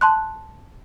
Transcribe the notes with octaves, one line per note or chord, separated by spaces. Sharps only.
A5 C6 F#6